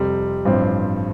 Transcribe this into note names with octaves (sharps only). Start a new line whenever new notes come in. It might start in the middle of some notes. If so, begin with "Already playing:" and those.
Already playing: F2 C3 G3
A1 G2 F3 C4